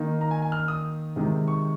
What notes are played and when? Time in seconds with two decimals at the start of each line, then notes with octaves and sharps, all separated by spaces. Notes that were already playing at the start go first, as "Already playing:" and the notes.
Already playing: D#3 A#3 D#4
0.21 A#5
0.31 G#5
0.42 G#5
0.52 F6
0.68 D#6
1.16 C3 D#3 G#3 D#4
1.48 C#6